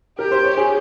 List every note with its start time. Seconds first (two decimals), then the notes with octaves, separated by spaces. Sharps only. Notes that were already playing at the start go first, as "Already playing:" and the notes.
0.18 G4 A#4
0.31 C5
0.44 C#5
0.57 G#4